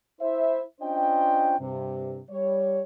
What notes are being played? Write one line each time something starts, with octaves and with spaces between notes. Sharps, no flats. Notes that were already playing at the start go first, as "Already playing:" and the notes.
E4 C5 E5
C#4 D4 F4 C5 D#5 G5
G2 C3
G3 C#5